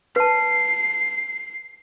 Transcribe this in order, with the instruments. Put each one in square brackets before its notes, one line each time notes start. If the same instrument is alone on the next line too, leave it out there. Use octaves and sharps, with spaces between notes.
[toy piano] B4 A5 [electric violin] C7